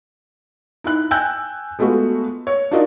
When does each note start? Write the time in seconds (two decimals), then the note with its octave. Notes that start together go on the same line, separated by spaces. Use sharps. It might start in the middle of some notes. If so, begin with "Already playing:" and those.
0.84 D#4 E4 F#6
1.11 G5 G#5 E6 F#6 G6
1.79 G#3 A3 B3 F4 F#4
2.47 C#5
2.71 D4 D#4 F4 F#4 A#4 D#5